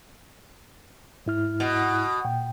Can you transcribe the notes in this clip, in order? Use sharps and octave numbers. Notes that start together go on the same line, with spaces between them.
G#2 E4 F6
B2
A#2 G5